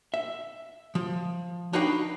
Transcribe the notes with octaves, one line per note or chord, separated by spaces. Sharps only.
E5
F3
D4 D#4 F#4 B4 F5 G5